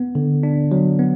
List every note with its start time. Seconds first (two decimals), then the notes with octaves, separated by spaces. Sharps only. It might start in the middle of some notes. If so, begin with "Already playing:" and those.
Already playing: B3
0.15 D3
0.43 D4
0.71 F#3
0.99 B3